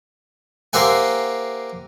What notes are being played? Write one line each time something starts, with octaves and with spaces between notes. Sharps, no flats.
A#3 G4 C5 E5 F#5 G#5